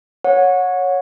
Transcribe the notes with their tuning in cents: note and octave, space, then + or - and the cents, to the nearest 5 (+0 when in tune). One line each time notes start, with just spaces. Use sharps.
C#5 +0 F#5 -25